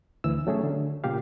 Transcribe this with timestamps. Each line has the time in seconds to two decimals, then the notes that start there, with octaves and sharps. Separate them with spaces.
0.24 D2 E3 E6
0.47 F#3 A3 C#4 G#4
0.64 D3
1.04 A#2 C#3 G4 F5